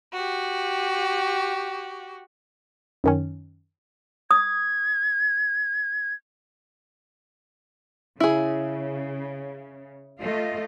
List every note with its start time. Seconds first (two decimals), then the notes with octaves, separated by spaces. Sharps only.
0.14 F#4 G4
3.04 F#2 D#3 C#4
4.31 D#6 G#6
8.20 C#3 E4 G#4
10.21 A3 F4 D#5